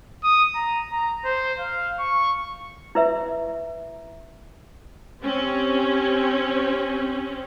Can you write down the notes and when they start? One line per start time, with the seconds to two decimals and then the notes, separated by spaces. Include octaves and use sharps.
0.24 D#6
0.55 A#5
0.92 A#5
1.25 C5
1.59 F5
1.99 C#6
2.95 E4 B4 E5
5.21 C4 C#4 G4